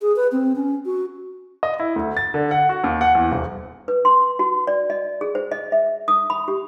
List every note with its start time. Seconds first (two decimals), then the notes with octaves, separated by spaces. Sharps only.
0.02 G#4
0.16 B4
0.32 C4
0.56 C#4
0.85 F#4
1.63 D#5
1.80 E4
1.96 D2
2.17 A6
2.34 D3
2.51 F#5
2.69 F#4
2.84 D#2
3.01 F#5
3.15 E2
3.32 D#1
3.88 B4
4.05 C6
4.39 F#4
4.67 D5
4.90 D#5
5.21 G#4
5.35 C5
5.51 D#5
5.72 E5
6.08 D#6
6.30 B5
6.48 G4